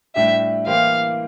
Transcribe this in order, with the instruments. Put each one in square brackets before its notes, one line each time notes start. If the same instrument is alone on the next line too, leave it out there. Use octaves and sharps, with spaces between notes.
[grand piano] A2 G3 D4 G4 [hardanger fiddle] E5
[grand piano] E3 A#3 E4 G4 C5 [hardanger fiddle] F5